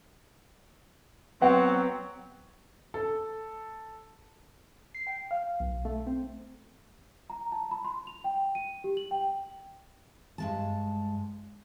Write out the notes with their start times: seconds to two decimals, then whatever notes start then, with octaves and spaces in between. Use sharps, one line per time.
1.42 F#3 B3 C4 F#5
2.94 A4
4.95 C7
5.07 G5
5.31 F5
5.60 B1
5.85 A3
6.07 C4
7.30 A#5
7.52 A5
7.71 B5
7.85 C6
8.07 F7
8.24 G5
8.55 D#7
8.84 G4
8.97 F#7
9.11 G5
10.38 G2 G#3 A5